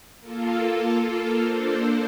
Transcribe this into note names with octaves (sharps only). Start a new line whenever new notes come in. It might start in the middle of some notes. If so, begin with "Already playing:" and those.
A#3 F4 A4
A#3 D4 A4 C5